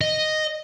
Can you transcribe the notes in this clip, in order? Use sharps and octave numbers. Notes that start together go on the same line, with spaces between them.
D#5